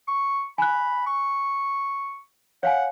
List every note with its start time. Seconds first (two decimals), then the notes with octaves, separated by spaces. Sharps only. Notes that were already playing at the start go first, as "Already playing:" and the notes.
0.08 C#6
0.58 G#5 B5 F#6
1.06 C#6
2.63 C#5 F5 F#5 G#5